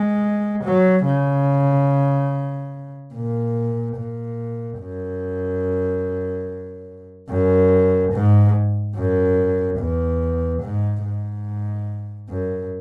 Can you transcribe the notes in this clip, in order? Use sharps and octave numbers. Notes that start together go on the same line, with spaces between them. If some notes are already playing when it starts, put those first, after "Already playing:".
Already playing: G#3
F#3
C#3
A#2
A#2
F#2
F#2
G#2
F#2
E2
G#2
G#2
F#2